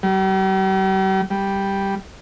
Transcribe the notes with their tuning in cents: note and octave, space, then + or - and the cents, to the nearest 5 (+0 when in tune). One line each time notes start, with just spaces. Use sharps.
G3 -45
G3 +0